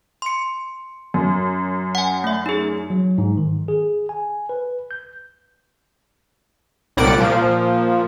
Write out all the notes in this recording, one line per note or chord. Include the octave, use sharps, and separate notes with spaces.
C6 C#7
F#2
F#5 G#5
A3 E5
D#4 G#4
F#3
G#2
D#3
G#4
G#5
B4
G6
C2 A#2 G3 D5 F#5 D7
A#2 F3